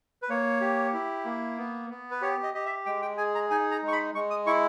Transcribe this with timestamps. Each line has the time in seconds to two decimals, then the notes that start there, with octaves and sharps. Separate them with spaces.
0.22 B4
0.29 A#3 C#5
0.61 G4
0.93 E4
1.25 A#3
1.57 B3
1.90 B3
2.11 B4
2.22 G4 C#5
2.43 D#5
2.54 G4 D#5
2.65 E5
2.86 G#3 G5
3.02 G5
3.17 G#4 G#5
3.35 A#5
3.50 D#4 G#5
3.71 A#5
3.83 G#3
3.88 C#6
3.92 B5
4.15 G#3 C#6
4.30 D#6
4.46 E4 C#6